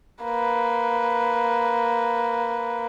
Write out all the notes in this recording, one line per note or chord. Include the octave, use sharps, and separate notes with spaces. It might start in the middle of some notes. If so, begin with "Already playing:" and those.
A#3 B4